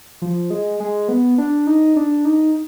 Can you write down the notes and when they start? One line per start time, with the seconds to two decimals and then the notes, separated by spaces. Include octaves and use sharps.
0.22 F3
0.50 G#3
0.80 G#3
1.08 B3
1.38 D4
1.67 D#4
1.96 D4
2.25 D#4